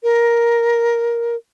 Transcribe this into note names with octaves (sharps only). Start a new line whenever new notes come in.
A#4